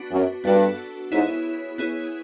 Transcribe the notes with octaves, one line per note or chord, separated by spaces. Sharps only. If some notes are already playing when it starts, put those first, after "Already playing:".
Already playing: B3 D4 F#4
F#2
G2 B3 D4 F#4 A4
G#2 B3 E4 G#4 C#5
B3 E4 G#4 C#5